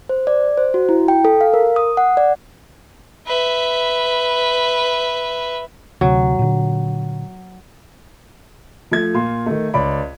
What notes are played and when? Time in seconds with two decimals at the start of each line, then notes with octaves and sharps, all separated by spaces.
0.09 C5
0.27 D5
0.58 C5
0.74 F#4
0.89 E4
1.08 G5
1.25 A4
1.41 F5
1.53 A#4
1.76 D#6
1.97 F#5
2.17 D5
3.27 B4 E5
6.01 D2 C3 F#3
6.39 A#2 D3
8.91 F3 A3 G#6
9.14 A#2 F4 C6
9.46 D#3 A3
9.74 C#2 C#5 D5 B5